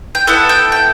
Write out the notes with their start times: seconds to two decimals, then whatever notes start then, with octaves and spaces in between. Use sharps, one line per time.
0.15 G5
0.27 B3 E4 A4 F#5
0.49 G5
0.72 G5